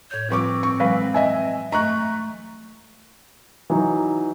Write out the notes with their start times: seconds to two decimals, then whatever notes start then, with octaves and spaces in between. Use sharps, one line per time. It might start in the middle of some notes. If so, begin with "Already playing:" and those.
0.11 A2 C#5 G6
0.30 F3 G3 C4 F4 B4 C#6 D6
0.63 C#6
0.80 E3 F#3 G#3 B4 F5 B5
1.14 D#5 E5 G#5
1.72 A3 D#5 A#5 C#6 F#6
3.70 E3 F#3 D#4